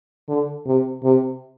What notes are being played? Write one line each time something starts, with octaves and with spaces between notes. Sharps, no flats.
D3
C3
C3